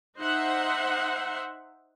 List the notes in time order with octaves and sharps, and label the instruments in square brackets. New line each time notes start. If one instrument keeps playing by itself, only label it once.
[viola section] D#4 C5 E5 F#5